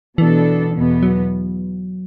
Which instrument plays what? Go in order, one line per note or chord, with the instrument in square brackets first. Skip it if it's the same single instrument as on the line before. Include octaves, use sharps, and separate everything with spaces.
[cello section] B2 B3 D4 A4 [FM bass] E3
[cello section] E2 B2 B3
[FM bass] F#3